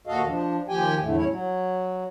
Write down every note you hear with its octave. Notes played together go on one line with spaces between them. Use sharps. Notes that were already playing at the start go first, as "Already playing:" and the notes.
D#2 A#2 F#4 A4 D#5 F5
F3 D4
D#2 F3 G4 G5 G#5
E2 A2 D3 A3
G3 C#4 E4 C#5
F#3